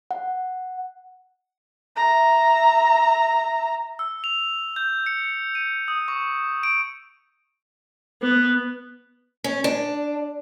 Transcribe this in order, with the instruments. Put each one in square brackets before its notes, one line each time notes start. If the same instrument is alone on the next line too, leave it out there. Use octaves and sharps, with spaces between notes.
[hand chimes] F#5
[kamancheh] E5 A#5
[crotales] E6
F7
G6
C#7
D#7
D#6
C#6
D7
[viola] B3
[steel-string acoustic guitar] C#4
D4